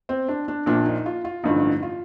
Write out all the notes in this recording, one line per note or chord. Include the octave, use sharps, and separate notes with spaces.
C4
D4
D4
A#1 A#2 F3 D4
D#4
F4
F4
A1 G2 D3 F3 D#4
F4